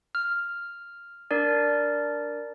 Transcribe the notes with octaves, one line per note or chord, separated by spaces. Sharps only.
F6
D4 A#4 D5